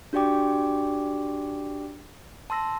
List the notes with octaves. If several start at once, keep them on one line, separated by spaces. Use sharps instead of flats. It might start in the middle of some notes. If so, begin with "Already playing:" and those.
D4 F#4 G4 D5 G5 D6
A5 C6 E6 A#6